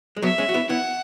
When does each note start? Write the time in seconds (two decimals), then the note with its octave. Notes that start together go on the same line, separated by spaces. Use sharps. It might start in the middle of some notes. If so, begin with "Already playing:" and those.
0.17 G#3
0.22 F#3 B3 E5
0.38 G#3 C#4
0.49 F#4
0.54 B3 E4
0.69 B3 E4 F#5